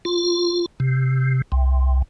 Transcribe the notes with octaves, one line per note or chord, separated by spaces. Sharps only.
F4
C3
C2